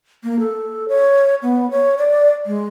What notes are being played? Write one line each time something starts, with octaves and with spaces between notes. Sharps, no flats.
A#3
A4
C#5
B3
C#5
D5
G#3